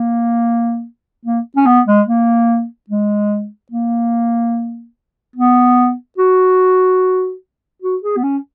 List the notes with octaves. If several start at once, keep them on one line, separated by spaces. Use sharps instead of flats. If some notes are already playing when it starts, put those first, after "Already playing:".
Already playing: A#3
A#3
C#4
B3
G#3
A#3
G#3
A#3
B3
F#4
F#4
G#4
B3
C#4